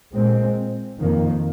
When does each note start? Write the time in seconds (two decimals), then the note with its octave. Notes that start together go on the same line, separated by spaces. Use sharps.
0.13 A#2 G#3 C4
0.98 F2 D#3 A#3